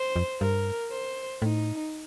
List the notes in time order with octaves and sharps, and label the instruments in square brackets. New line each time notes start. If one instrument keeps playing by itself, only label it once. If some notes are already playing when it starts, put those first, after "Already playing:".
Already playing: [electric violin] C5
[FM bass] F2
[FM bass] G2 [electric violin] A#4
[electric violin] C5
[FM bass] A2 [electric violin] D#4